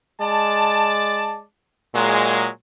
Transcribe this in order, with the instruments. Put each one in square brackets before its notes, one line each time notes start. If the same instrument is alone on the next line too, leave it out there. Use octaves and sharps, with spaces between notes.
[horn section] G#3 D5 A5
A#2 F#3 G#3